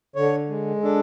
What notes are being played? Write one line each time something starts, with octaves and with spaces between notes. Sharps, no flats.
D3 C#5
G#3
D4 A4